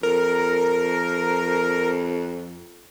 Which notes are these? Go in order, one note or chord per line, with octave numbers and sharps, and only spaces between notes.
F2 A#4